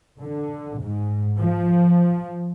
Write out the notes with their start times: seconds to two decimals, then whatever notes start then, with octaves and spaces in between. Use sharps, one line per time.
0.21 D3
0.79 G#2
1.40 F3